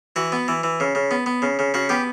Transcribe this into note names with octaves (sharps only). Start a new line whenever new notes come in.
E3 F#4
B3
E3
E3
C#3
C#3
B3
B3
C#3
C#3
C#3 F#4
B3 G4